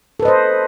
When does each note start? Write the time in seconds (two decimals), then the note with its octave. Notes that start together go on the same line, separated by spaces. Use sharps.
0.20 A4
0.22 B4
0.25 D#5
0.28 C5